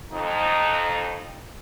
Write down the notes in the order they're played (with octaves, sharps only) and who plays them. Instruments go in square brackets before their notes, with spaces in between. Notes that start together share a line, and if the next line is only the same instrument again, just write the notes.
[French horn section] F2 D#4